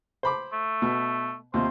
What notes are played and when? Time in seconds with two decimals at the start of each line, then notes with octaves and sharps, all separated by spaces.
0.23 C5 B5 D6
0.53 A3
0.82 B2
1.54 D#2 C3 F4 C5